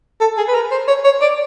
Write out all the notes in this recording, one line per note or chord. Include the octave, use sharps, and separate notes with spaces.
A4
G#4
B4
A#4
C5
C#5
C#5
D5